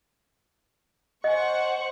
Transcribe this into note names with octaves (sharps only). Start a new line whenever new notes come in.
C5 D#5 F#5 G#5 C#6